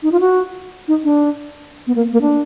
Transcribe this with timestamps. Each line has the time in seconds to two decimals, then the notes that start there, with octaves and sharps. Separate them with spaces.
0.03 D#4
0.12 F4
0.20 F#4
0.88 D#4
1.04 D4
1.87 B3
1.96 A#3
2.13 A#3
2.21 D4